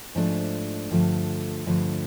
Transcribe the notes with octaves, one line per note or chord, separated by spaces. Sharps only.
G#2 F3 A3 D4
G2 D3 F3 A3
G2 D3 F3 A3